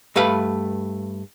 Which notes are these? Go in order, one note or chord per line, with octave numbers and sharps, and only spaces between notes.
G2 A3 B4 F5 B5